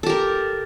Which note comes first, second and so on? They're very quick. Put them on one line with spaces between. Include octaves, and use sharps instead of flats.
A4 G4 A#4